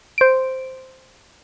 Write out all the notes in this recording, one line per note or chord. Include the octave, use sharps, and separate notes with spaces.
C5 D7